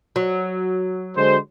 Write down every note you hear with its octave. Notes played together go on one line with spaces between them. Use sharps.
F#3
D3 G#3 C5